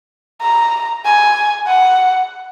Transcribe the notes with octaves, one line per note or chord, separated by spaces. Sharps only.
A#5
G#5
F#5